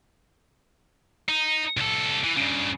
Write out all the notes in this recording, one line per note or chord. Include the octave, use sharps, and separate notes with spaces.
D#4
C2 A4
E3
G2 C#3